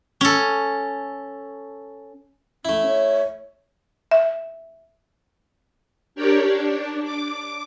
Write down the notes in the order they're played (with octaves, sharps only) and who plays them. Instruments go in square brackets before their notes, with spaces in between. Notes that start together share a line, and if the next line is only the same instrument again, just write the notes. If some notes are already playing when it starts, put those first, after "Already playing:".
[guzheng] C#4 A4
[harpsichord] A3 E4 [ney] C#4
[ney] C#5
[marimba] E5
[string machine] D4 G4 A#4 C#5 D5 G5
D4
D6